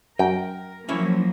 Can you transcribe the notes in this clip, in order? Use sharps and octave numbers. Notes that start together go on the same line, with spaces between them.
F#2 A#4 G5
F3 F#3 A#3 C#4 E4 C#5